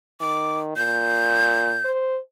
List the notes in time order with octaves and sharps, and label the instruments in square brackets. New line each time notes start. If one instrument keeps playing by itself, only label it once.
[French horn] D#3 [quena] D6
[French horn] A#2 [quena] G6
[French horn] C5